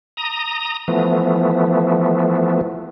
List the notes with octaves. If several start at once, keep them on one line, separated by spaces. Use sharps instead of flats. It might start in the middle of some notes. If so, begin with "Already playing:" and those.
A#5 D#6
E3 F3 A3 B3